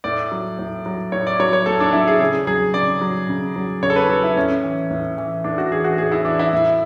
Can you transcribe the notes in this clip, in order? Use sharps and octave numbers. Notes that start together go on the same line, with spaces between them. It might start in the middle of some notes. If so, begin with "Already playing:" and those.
A2 D5
F#3
A2
F#3
A2 C#5
D5
F#3 C#5
C#5
A2 A4
D4
F#3 E4
G#4
C#3 G#4
F#3 G#4
C#3 D5
F#3
C#3
F#3
C#3 C#5
A4
B4
F#3 A4
E4
A2 C#4
E3
A2
E3
A2 D4
F#4
E3 G#4
F#4
A2 G#4
E4
E3 D4
E4
A2